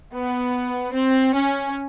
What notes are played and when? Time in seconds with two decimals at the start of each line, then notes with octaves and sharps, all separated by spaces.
0.12 B3
0.93 C4
1.34 C#4